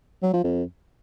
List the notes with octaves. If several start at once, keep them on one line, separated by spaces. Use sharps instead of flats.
F#3
F3
F2